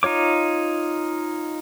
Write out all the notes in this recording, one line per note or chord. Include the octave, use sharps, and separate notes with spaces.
D#4 F4 C#5 D6